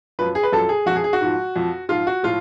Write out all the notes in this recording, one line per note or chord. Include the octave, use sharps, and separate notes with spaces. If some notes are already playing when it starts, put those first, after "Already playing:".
F#2 F3 B4
G#4
B4
F#2 F3 A4
G#4
F2 F#4
F3 G#4
G#4
F#4
G#2 F3
F2 F3
G#2 F3 F4
F#4
A2 F3 F4